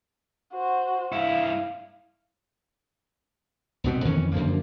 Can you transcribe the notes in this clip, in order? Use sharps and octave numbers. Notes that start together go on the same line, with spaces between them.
F#4 C5
G2 E4 F5
C2 B2 B3 C4
F2 D#3 E3 C#4
F#2 D3 F3 A#3